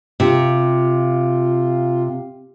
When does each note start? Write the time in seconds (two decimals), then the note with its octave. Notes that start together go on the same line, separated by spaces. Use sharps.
0.20 C3 F4